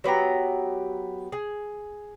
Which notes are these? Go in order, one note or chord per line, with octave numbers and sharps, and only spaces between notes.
F#3 B3 G4 A#5
G#4